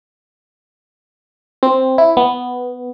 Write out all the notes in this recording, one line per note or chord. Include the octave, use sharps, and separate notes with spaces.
C4
E4
B3